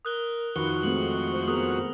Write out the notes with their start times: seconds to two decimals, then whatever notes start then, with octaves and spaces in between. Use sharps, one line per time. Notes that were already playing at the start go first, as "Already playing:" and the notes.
0.05 A#4 D#6 F#6 G7
0.56 F2 D#3 F#4 B4 C#6 G7
0.83 G#3 A3 C4 F#7
1.32 C5
1.48 B3 G#4 A#4 D#6